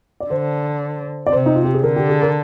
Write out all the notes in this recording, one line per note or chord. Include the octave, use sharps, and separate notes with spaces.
D5
D3 C5
D5
C3 C5
D#4
F4
G4
G#4
D3 A#4
G4
G#4
A#4